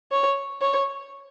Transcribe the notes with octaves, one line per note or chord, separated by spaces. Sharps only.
C#5
C#5